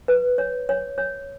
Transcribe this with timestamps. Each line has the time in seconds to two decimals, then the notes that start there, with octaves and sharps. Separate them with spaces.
0.08 B4
0.38 C#5
0.69 C#5
0.98 C#5